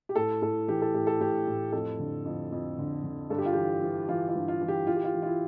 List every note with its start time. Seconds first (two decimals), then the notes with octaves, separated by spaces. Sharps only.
0.09 G4
0.15 A2 A4
0.42 A2 A4
0.68 E3 G4
0.82 A4
0.94 A2 G4
1.07 A4
1.21 A2 G4
1.47 A2
1.72 F2 A4
1.99 D3
2.25 F2
2.52 F2
2.78 D3
3.04 D3
3.30 G2 A4
3.38 G4
3.45 F4
3.53 E3 G4
3.82 E3
4.09 E3 F4
4.29 F4
4.35 G2
4.48 F4
4.61 E3
4.68 G4
4.87 E3 F4
4.96 G4
5.04 F4
5.13 E3
5.22 F4
5.26 E4